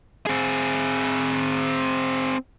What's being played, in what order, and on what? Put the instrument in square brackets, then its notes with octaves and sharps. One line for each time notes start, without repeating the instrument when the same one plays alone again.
[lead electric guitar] C4 G#4